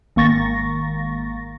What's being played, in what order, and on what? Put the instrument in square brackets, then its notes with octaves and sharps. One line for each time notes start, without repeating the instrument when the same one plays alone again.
[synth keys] G#1 A#3 C#6 A6 A#6